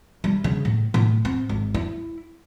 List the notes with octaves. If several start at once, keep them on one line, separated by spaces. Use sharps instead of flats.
G3
C#3
A2
A2
C4
G#1
E4